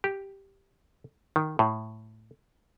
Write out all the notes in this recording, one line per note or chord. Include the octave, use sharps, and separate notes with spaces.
G4
D#3
A2